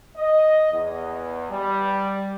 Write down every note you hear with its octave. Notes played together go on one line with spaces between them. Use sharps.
D#5
E2
G3